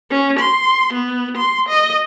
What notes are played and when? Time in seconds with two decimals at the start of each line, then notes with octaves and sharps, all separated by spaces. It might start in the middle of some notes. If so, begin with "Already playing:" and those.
0.11 C#4
0.39 C6
0.93 B3
1.37 C6
1.69 D#5